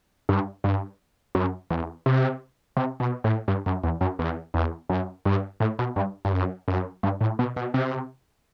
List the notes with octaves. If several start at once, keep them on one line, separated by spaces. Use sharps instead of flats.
G2
G2
F#2
E2
C3
C3
B2
A2
G2
F#2
E2
F#2
E2
E2
F#2
G2
A2
B2
G2
G2
F#2
F#2
G2
A2
B2
B2
C3